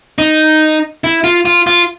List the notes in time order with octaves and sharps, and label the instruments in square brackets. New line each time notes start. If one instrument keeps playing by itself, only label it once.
[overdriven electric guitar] D#4
E4
F4
F4
F4